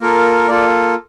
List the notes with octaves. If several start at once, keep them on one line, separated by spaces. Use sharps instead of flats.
A#3 F4 A4 A#4
A#3 F4 A4 D5